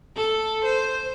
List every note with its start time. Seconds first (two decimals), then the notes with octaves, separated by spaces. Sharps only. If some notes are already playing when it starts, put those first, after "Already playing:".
0.16 A4
0.64 C5